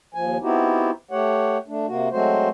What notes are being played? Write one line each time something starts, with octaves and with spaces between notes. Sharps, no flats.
D#2 F3 G#5
B3 C4 D#4 E4 F#4 G4
A3 G4 C#5 F#5
A3 D4
C3 A#3 F#4
F#3 G#3 A3 C4 F#4 C5